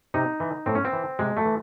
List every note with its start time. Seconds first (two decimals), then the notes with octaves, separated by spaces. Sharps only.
0.14 C3 D#4
0.40 E3
0.66 A2 C4
0.75 C#4
0.85 C4
0.93 E3
1.19 C3 G#3
1.37 A3
1.45 E3